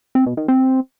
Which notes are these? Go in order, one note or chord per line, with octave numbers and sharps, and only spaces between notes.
C4
B2
D#3
C4